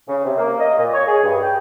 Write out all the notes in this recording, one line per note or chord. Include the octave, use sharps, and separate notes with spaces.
C#3
C3
A#3
D#5
A#2
C#5
G#4
G2
G5